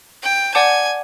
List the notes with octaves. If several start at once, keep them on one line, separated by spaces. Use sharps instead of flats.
G5
D5 F#5 G#5 A5 D6 G6